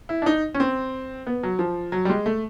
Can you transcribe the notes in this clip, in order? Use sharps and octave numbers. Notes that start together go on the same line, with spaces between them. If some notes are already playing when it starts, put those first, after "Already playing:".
E4
D4
D#4
C#4
C4
B3
F#3
F3
F#3
G3
G#3
A3